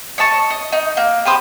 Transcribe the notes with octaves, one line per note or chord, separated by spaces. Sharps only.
C#5 D#5 A5 C#6
D#5
D#4
A#3
G4 B4 C5 D#6